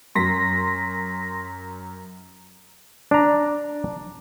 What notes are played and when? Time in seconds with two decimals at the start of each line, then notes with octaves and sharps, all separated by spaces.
0.15 F#2 C6 A#6 B6
3.11 D4 A#5